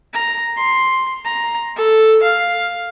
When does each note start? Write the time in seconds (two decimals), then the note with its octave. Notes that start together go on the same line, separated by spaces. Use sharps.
0.13 A#5
0.57 C6
1.25 A#5
1.76 A4
2.23 F5